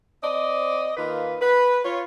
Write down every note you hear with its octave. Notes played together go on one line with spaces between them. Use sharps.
C4 D5 D#5
D#3 A#3 F4 B4
B4
F4 C#5